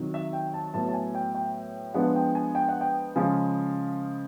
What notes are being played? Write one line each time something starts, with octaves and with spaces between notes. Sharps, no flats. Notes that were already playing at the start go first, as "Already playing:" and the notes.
Already playing: C3 D#3 F#3
E5
G5
A5
A2 F#3 B3 A5
A5
G#5
G5
G5
F3 G#3 B3 D4 F#5
G5
G#5
G5
F#5
G5
C#3 F3 G#3 G#5